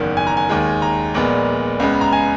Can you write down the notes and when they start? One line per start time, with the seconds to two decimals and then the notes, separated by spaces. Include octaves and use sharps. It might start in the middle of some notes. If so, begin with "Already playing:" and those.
Already playing: F#1 E2 D#3 F#5
0.17 G#5
0.27 A#5
0.37 G#5
0.49 D#2 D#3 G#3
0.82 A#5
1.14 A#1 A#2 G#3 B3
1.80 C#2 C#3 G#3 B3
2.01 A#5
2.13 G#5